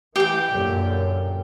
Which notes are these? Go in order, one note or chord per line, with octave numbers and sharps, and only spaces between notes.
E3 G4 G5
F#2 A#2 D3